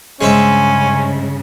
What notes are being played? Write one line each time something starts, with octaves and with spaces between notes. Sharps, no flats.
G2 C#3 G#3 C4 C#4 E5